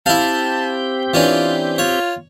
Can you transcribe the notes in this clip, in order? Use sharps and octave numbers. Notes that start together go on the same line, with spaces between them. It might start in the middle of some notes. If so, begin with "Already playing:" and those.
C4 E4 G4 F5 A5 G6
E3 C#4 D4 F4
F4 C#5